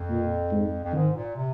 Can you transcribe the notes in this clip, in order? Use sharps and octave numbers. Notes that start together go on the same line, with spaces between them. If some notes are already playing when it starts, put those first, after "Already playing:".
Already playing: F2
A#2
G#2
F2
G#2 D#3
A#2
C3